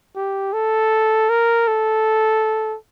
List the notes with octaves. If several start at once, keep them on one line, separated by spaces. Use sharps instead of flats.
G4
A4
A#4
A4